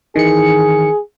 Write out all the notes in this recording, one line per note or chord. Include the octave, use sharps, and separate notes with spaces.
D#3 E3 G#4 C#7